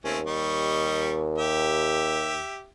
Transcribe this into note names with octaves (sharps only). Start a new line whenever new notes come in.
D#2 A3 C4 C#4
G3 D#5 C#6
G4 E5